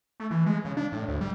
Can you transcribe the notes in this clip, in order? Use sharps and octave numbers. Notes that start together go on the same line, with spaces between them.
A3
E3
G#3
C#3
D4
A2
D2
G3